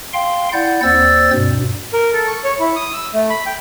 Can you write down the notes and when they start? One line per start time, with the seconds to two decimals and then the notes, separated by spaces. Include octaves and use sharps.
0.13 F5 G5 C6
0.53 E4 D5 F#5 G6
0.82 D#2 C4 C5 D5 E6 A6
1.33 G2 B2
1.93 A#4
2.13 A4
2.28 C#6
2.44 C#5
2.60 E4
2.76 D#6
2.93 E6
3.13 A3
3.30 B5
3.46 G5